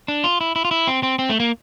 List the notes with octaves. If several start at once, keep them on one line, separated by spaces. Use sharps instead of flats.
D4
F4
E4
E4
F4
E4
C4
C4
C4
A3
A#3